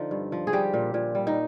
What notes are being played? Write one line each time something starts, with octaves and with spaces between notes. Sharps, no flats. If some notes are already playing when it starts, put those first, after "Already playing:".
Already playing: D3 F3 D#4
G2
F3
G#4
G3 G4
A#2
A#2
G3
D#4